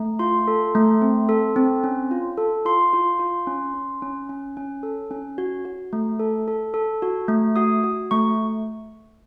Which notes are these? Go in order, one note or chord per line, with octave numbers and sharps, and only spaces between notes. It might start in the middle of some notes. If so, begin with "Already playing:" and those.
Already playing: A3
F4 C6
A4
A3
C4
A4
C4
C#4
F4
A4
F4 C6
F4
F4
C#4
C#4
C#4
C#4
C#4
A4
C#4
F#4
F#4
A3
A4
A4
A4
F#4
A3
F#4 D#6
F#4
A3 C#6